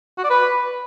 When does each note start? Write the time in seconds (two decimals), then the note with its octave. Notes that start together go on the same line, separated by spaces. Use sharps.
0.18 F#4
0.24 D5
0.30 B4